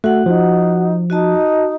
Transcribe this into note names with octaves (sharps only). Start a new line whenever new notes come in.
A3 F#4 F#5
F3 D#4
D#4 F#4 D#5 A5